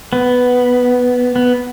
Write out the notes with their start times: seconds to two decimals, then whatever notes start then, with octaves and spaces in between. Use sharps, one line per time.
0.13 B3
1.36 B3